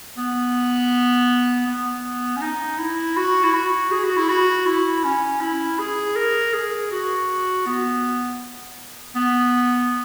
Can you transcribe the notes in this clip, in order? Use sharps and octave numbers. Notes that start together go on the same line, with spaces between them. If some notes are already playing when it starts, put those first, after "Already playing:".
B3
B3
C#4
D#4
E4
F#4
E4
F#4
G#4
F#4
E4
F#4
E4
C#4
E4
G#4
A#4
G#4
F#4
B3
B3